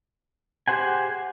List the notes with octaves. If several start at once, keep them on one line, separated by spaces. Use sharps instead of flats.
G4 G#4 C5 F#5 G#5